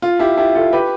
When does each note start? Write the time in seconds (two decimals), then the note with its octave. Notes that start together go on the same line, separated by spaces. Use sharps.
0.02 F4
0.19 E4 G4
0.37 E4 G4
0.55 F4 A4
0.72 G4 B4